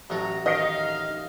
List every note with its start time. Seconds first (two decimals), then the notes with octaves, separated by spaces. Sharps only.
0.10 A1 F#3 A4 A#5
0.46 D#3 D#5 F5